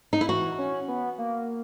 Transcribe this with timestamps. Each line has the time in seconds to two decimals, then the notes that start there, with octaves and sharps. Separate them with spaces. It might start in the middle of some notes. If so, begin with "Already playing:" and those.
0.13 D#4
0.21 E4
0.28 E3 F#4
0.58 C#4
0.88 B3
1.18 A#3